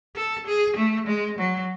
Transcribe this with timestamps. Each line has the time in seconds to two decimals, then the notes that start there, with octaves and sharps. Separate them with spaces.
0.16 A4
0.46 G#4
0.77 A3
1.07 G#3
1.38 F#3